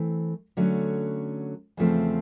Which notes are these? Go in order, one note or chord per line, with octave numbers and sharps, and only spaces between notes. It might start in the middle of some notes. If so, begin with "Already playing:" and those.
Already playing: E3 A3 C4
D3 F#3 A3 C#4
E2 C#3 F3 A3 C4